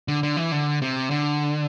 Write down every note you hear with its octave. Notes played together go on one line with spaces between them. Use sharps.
D3
D3
E3
D3
C3
D3